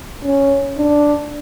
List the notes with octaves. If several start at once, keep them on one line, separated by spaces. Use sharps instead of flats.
C#4
D4